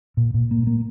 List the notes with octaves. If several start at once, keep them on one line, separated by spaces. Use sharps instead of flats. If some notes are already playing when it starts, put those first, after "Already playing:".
A#2
A#2
A#3
A#3